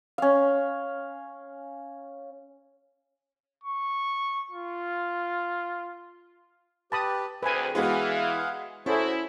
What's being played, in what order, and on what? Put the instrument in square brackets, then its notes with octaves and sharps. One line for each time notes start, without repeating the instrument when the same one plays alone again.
[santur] C#4 F5
[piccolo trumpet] C#6
F4
[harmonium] G4 B4 [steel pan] A5 B5 D#6
[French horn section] D2 [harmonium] C4 G#4 [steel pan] B4 G#5
[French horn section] E3 [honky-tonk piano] G#3 B3 F#4 [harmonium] G#4 F5 F#5
[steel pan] C#4 [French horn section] E4 [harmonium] F#4 G#4 C5 [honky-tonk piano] A4